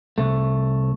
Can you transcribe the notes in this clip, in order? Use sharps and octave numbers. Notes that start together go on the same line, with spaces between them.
C2 A3